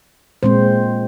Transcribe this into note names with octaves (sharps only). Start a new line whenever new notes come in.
A#2 G#3 C4 C5